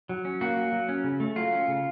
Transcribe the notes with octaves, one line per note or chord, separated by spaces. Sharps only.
F#3
C#4
A#3 F#4
F#3
F#3
C#4
C#3
A3
F#3 F4
C#4
C#3